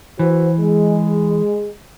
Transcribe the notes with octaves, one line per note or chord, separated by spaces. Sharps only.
E3 F#4 B4 C5
G#3